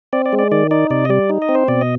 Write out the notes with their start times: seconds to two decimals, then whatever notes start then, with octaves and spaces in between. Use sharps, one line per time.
0.13 C4 D5
0.26 D5
0.33 G#3
0.39 D5
0.52 D#3 D5
0.71 D#4 D5
0.90 C3 D5
1.05 D#5
1.09 G3 D5
1.30 D#4
1.42 D#5
1.49 C4
1.55 C5
1.68 B2 D5
1.81 D#5